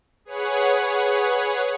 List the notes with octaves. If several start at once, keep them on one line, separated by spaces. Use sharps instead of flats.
G#4 B4 C#5 F#5